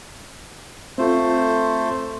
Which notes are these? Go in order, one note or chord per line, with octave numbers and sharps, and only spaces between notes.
A3 C4 F4 A4 C5